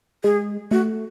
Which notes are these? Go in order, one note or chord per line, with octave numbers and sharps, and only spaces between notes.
G#3 G#4
A3 F#4